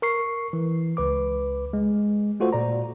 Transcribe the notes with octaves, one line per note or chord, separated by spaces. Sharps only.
A#4 C#6 C7
E3
C#2 B4 D6
G#3
A3 F4 F#4 A4 C5
A#2 D5 A#5